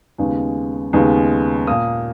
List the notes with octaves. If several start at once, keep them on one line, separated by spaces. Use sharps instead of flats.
D#2 C#3 G#3 B3
D#2 C#3 G#3 B3
A#2 A#3 D#6